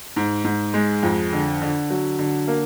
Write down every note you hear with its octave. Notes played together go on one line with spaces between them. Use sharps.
G#2
G#2
G#3
F2
D3
D3
F#3
D3
A#3